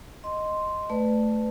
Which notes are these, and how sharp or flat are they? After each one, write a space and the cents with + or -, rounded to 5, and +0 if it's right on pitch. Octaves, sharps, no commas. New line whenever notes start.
D#5 +0 C6 +0
A3 +0 B4 +25 D5 +15